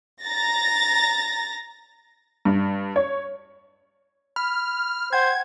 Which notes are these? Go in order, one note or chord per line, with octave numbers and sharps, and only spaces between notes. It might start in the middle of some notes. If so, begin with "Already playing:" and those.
A#5 A6 A#6
G2
C#5
B5 F6
C5 F#5 G5 G#6